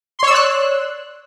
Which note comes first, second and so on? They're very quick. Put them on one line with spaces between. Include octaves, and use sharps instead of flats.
C6 C#5 E6 D5 F#6